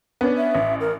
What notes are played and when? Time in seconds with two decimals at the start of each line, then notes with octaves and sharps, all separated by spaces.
0.21 B3 C#4 D4
0.37 E5
0.55 A1
0.80 A#4